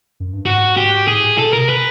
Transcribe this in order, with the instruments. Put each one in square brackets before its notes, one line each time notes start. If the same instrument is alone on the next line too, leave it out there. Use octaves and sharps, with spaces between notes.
[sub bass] F#2
G2
[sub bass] G#2 [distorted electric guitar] F#4
[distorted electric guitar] G4
[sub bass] A2 [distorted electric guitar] G#4
[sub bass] B2 [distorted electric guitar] A4
[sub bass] C3 [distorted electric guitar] A#4
[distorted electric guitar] B4